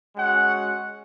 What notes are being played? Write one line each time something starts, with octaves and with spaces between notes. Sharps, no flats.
G#3 C#4 F#4 F#5